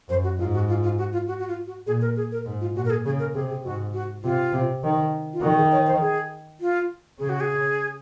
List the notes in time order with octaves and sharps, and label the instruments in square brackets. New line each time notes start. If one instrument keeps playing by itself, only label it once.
[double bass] F#2 [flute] C5
[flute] F#4
[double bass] G#2 [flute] F4
[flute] F#4
F4
F4
F#4
F4
F#4
F#4
F4
F#4
[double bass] A#2 [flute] G#4
[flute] A#4
G#4
A#4
[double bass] G#2
[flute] F4
[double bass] A#2 [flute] F#4
[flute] A#4
G#4
[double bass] C#3 [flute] G#4
[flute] A#4
[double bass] C3 [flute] G#4
[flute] G#4
[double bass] G#2 [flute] F#4
[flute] F#4
[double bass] C3 [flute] F4
[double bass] C3
D#3
[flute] F4
[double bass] D#3 [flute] F#4
[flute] G#4
C#5
C5
G#4
F4
[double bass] C#3 [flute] G#4
[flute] F#4
G#4